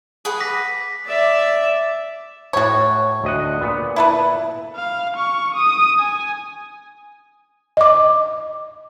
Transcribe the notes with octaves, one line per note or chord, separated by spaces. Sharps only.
G#4 B4 F#5
D6 A#6 B6
D5 E5
A2 F#4 C#5 A5
D2 D#5 F#5
A#2 B3
E4 A4 B4
F5
C#6
D#6
G#5
D#5 D6